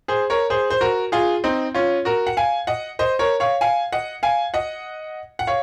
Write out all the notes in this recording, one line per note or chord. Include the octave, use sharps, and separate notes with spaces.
G#4 C5
A#4 C#5
G#4 C5
C5
F#4 A#4
F4 G#4
C4 D#4
C#4 F4
F#4 A#4
F#5
F5 G#5
D#5 F#5
C5 D#5
A#4 C#5
C#5 F5
F5 G#5
D#5 F#5
F5 G#5
D#5 F#5
F#5
C#5 F5